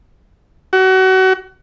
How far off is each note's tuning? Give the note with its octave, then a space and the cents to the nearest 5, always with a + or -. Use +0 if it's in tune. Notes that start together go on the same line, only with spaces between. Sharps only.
F#4 +30